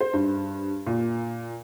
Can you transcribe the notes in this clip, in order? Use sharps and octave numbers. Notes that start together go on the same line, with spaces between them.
C5
G2
A#2